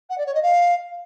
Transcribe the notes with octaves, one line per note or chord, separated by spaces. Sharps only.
F#5
D5
C#5
D#5
F5